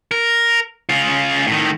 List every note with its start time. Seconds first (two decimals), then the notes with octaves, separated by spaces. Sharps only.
0.11 A#4
0.89 C#3 F4
1.47 A2 D#3